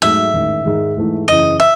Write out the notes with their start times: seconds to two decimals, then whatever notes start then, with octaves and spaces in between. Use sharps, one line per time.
0.02 G#2 F#3 A3 D#4 E5
0.34 A1 G#2 D#3
0.65 G#2 D#3 G#3 D#4
0.97 G#2 E3 A3
1.28 F#2 C#3 E3 D#5
1.60 E5